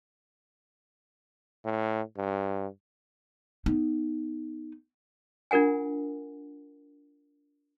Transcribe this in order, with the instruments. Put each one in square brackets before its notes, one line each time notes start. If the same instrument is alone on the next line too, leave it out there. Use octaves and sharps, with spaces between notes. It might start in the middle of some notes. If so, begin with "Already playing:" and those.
[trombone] A2
G2
[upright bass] B3 D#4
[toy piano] D4 F4 A#4 F#5 G#5